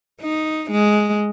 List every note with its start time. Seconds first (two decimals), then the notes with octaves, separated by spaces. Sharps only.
0.21 D#4
0.71 G#3